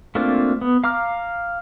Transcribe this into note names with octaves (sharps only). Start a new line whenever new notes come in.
A3 A#3 C4 D4 F4
B3
F5 A#5 D6 F6